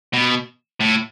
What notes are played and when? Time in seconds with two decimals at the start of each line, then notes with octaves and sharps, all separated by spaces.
0.13 B2
0.81 A2